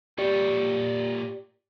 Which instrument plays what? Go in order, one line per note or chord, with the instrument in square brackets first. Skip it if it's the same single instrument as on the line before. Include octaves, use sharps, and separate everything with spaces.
[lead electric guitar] A#2 C#5 [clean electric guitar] G4 D5